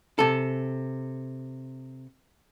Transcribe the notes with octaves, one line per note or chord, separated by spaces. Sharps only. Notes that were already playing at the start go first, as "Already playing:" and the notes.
C3 A4